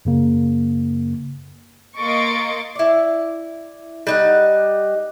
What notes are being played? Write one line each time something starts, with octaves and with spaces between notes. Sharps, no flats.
F#2 C#3 A#3
A#3 D#5 C6 C#6 A6 D7
E4 D5
G3 D#4 F#5